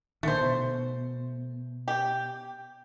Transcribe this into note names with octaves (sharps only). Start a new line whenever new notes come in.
A#2 D3 D#3 A3 C5
B2
G4